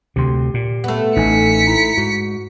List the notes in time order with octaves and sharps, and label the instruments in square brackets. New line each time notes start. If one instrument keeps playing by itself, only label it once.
[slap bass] D2 C3 [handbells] G4 C6
[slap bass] A#2
[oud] A3 B3
[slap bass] A1 [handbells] D#4 G#5 [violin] B6 C#7
[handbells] E4 A#5
[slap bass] G#2 [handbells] F#4